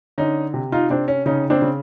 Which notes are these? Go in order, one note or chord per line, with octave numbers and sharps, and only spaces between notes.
D3 C#4 D#4
C3
D#4 F4
C3 C4 D4
C#4
C#3 C#4 D#4
C4 D4
C#3